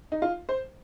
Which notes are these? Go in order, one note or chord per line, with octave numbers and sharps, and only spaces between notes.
D#4
F4
C5